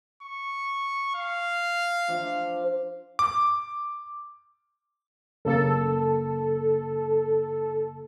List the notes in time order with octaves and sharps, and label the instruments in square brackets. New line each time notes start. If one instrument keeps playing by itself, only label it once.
[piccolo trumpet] C#6
F5
[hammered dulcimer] F3 D4
[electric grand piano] D6
[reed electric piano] F#2 C#3 A#3 [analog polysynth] A4